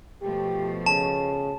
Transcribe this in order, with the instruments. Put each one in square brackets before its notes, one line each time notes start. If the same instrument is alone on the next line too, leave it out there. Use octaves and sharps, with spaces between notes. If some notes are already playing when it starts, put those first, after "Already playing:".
[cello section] B2 F3 A3 [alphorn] G4
[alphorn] C#3 [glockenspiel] A5